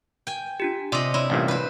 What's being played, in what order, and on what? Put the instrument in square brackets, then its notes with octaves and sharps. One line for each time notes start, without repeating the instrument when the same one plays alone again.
[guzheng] G5 G#5
[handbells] D4 F4 G4
[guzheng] C3 D#5 [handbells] D5 C6 E6
[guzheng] E4 [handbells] C#5 D5 C6
[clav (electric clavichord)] A1 G2 A#2
[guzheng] B4 C5